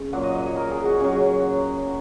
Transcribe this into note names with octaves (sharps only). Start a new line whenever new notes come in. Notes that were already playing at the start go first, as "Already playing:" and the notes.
Already playing: C#3
A#2 F#3 F#5
D#5
D#5
C#5
A#4
G#4
F#4
C#3 F#3 G#4